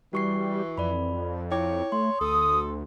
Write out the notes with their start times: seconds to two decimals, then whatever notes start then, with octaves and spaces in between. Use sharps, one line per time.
0.13 E3 G3 F#4 C#6 C7
0.78 F2 D5 B5
1.51 E4 C#5 G5 D6
1.92 A3 C6
2.21 D2 A4 D#6